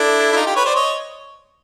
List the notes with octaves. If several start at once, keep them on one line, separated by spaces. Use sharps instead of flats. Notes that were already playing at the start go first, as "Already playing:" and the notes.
Already playing: D4 E4 A4
E4
D#4 F4
F4 G4
B4 C#5
C5 D5
C#5 D#5